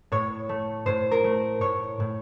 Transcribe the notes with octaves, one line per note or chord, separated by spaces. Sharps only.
A2 C#5
A3
A2 C5
A#4
A3
A2 C#5
A2